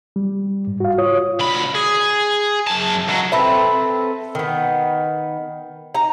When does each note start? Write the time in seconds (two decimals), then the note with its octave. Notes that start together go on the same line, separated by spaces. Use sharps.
0.16 G3
0.67 G#2
0.80 F#4 F5
0.98 F4 C#5 D#6
1.40 D2 B5
1.75 G#4
2.67 F#2 A5
3.08 C#2 F#3
3.32 C4 A4 B4 E5
4.35 D#3 B3
5.94 D#4 A#5